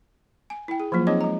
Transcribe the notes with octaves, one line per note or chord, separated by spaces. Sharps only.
G#5
E4 G5
G#4
F3 F#3 A#3 F4
C4 D#4 G#4 C#5 D#5 D6
G#3 A#5